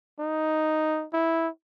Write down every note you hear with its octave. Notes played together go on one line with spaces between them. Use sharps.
D#4
E4